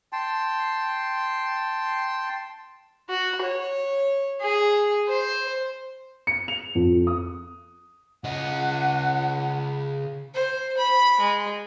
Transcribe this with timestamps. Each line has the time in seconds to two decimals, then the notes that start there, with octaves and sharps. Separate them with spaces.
0.13 G5 A5 C6
3.10 F#4
3.43 C#5
4.42 G#4
5.09 C5
6.27 C#7
6.48 F7
6.75 F2
7.07 D#6
8.24 C#3 D#5 F#5
10.34 C5
10.77 B5
11.20 G#3